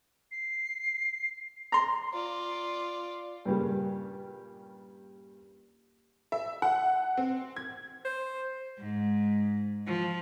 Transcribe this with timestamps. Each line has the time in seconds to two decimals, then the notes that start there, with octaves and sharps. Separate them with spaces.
0.31 C7
1.72 A#5 C6
2.14 F4 D5
3.45 G2 A#2 C#3 G3 A#3
6.32 E5
6.62 F#5
7.17 C4
7.56 G#6
8.05 C5
8.78 G#2
9.87 F3